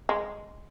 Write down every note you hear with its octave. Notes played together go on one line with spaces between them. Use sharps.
G#3